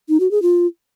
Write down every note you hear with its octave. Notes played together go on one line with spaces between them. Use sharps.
D#4
F#4
G#4
F4